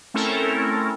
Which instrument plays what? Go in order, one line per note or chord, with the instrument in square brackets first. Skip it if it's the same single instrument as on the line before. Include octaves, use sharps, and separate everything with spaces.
[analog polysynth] A3 C4 C#4 E4 A4 A#4